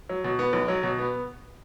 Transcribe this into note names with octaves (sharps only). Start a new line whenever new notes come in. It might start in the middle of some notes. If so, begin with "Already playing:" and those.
F#3
B2
B3
B1
F#3
B2
B3